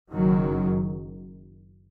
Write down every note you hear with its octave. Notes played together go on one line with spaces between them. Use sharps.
F#1 F#2 D#3 F#3